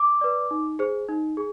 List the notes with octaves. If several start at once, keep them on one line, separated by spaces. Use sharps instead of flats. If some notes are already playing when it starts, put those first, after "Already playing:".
Already playing: D6
B4 D5
D#4
G#4 C5
D#4
G#4